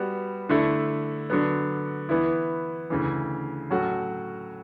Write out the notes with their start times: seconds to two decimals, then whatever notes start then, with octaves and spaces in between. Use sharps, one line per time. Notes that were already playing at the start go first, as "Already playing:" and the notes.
Already playing: G3 B3 F#4
0.49 D3 A3 E4
1.30 D3 F#3 B3
2.09 E3 B3 E4
2.90 D2 C#3 E3
3.70 A2 F#3 C#4 F#4 A4